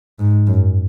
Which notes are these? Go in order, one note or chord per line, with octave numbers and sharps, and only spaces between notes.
G#2
F#2